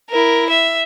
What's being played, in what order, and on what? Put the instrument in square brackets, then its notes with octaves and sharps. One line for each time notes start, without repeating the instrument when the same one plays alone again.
[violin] E4 A#4
E5